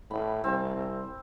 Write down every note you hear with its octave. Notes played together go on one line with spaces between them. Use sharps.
A2 B5
C2 C4